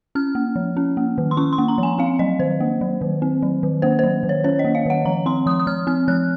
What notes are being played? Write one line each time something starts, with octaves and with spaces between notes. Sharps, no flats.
C#4 F6
A#3
F3
C#4
A#3
D#3
C6
C#4 C#6
C6
A#3
A#5
F3
G#5
C4 F5
F#3 D#5
D#3 C5
A#3
F#3
D#3
C4
F#3
D#3
A#3 C5
F#3 C5
D#3
C#5
C#4 C#5
D#5
A#3
F5
D#3 F#5
F3 A#5
C4 C6
F3 D#6
D#6
F3 F6
C4 F6
F3 F#6